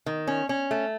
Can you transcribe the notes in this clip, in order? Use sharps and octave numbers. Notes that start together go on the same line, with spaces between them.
D#3
C#4
C#4
A3